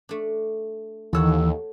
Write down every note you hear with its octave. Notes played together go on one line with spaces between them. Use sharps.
A3 D4
D#2 E3 A4 C#5 F#5 E6